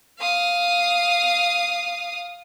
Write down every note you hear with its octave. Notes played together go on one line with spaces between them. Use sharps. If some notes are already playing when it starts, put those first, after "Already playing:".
F5 D#6